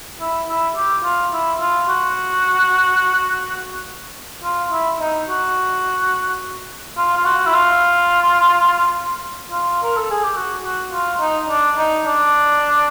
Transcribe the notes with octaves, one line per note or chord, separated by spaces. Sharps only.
E4
E4
G4
F4
E4
F4
F#4
F4
E4
D#4
F#4
F4
F4
F#4
E4
F4
F4
A#4
A4
G#4
G4
F#4
F#4
F4
D#4
D4
D#4
D4